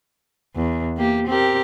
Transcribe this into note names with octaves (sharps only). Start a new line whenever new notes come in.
E2
A#3 G4
C4 G4 A#4